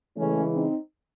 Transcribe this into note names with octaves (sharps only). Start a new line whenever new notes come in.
C#3 E3 G#3 A3 C#4
C4 D#4